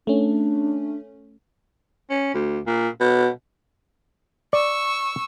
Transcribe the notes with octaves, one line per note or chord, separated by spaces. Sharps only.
A3 C#4 D4
C#4
D2
A#2
B2
D5 C#6 E6